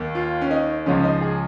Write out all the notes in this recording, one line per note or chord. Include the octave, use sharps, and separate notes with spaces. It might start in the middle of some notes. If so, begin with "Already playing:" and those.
Already playing: D#2 D#3
F4
C#4
D#4
C#2 C#3 F3 C#4
D#4
G#4